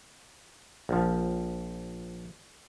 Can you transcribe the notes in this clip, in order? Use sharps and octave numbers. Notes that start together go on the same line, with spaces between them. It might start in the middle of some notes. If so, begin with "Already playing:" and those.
A#1 F3